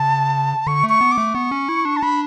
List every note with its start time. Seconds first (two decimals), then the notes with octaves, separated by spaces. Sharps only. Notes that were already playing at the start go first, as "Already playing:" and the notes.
Already playing: C#3 A5
0.67 D3 C#6
0.84 A3
0.89 C#6
1.00 B3
1.12 D6
1.18 A3
1.35 B3 C#6
1.51 C#4
1.69 E4
1.85 D4
1.96 A5
2.02 D4 B5